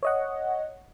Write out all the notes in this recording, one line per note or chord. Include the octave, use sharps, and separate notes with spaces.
C#5 D#5 F#5